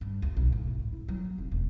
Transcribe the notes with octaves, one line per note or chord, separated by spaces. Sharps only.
G2
D2
B1
A2
D2
G#2
E4
F#3
A#3
F1
E1